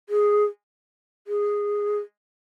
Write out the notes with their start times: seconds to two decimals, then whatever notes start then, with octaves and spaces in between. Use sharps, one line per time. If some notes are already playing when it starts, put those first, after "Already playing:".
0.09 G#4
1.27 G#4